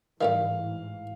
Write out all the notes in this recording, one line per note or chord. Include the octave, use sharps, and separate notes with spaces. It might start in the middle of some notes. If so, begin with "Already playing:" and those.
A1 G#2 D#3 E3 G3 A3 F5